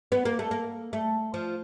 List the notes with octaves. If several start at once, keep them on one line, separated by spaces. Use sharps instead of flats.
B3
A#3
A3
A#3
A3
F3